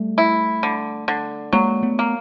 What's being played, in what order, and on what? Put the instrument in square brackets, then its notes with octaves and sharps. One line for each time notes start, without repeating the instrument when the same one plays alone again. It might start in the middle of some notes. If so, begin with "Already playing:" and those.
Already playing: [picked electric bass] G3 A3
[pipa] E4
D3
D3
[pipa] F#3 [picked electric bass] G#3 A#3
[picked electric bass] A3 B3
[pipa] A#3